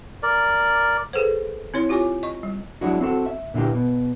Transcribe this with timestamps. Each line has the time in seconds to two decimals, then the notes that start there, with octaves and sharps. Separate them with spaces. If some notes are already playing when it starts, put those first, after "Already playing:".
0.23 A#4 D5
1.13 G#4 A4 B4 C5
1.74 C4 E4 C#5 C6
1.89 F4 G4 C#5 G#5 D6
2.23 D#5 C#6
2.43 G3
2.81 F#3 G#3 D4 E4 F#4
3.01 C4 F#4 A4
3.26 E5
3.54 A#2 D3 E3 A#3 G4
3.75 B2